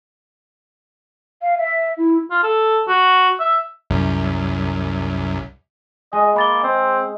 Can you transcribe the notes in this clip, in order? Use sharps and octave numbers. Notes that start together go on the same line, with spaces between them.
F5
E5
E4
F4
A4
F#4
E5
C2 F#2
G#3 D#5 G#5
A#3 B5 A6 G7
C4 D#5